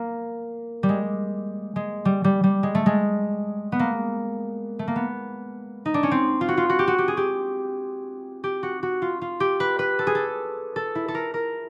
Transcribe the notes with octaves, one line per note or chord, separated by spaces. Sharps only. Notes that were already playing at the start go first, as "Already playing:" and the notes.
Already playing: A#3
G3
G#3
G#3
G3
G3
G3
G#3
A3
G#3
B3
A#3
A3
A#3
B3
D#4
D4
C#4
C4
F4
F#4
F4
F#4
G4
F#4
G4
G#4
G4
G4
F#4
F#4
F4
F4
G4
B4
B4
A4
G#4
A4
A4
E4
A4
A#4
A#4